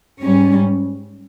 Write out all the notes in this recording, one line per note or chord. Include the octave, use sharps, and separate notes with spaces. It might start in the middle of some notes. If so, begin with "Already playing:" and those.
G#2 G3 C#4